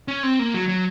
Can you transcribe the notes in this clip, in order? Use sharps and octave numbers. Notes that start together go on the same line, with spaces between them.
C#4
C4
A#3
F#3
F#3